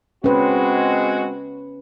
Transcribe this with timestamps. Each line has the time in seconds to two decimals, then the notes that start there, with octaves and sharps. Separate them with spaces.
0.24 G#3 C4 C#4 F#4 B4